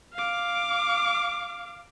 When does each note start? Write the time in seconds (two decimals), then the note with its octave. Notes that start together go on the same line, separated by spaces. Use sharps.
0.14 F5 D6